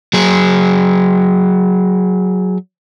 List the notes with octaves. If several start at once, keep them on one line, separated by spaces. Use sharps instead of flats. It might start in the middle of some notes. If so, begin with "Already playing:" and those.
F#3 G#4